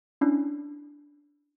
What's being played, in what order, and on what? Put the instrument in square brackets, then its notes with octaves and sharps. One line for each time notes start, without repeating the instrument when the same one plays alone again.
[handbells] C#4 D4 E4